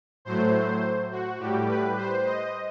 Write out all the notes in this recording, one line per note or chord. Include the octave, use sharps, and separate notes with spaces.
A2 F#3 A3 C5
F#4
A2 G3 G4
B4
C5
D#5